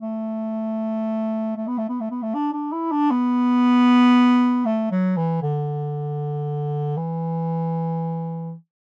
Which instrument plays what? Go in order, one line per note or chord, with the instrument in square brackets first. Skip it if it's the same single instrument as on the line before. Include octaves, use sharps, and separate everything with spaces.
[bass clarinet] A3
A3
B3
A3
B3
A3
B3
A3
D4
D4
E4
D4
B3
A3
F#3
E3
D3
E3